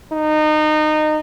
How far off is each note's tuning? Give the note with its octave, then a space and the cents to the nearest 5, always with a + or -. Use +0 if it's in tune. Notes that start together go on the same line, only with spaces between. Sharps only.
D#4 -25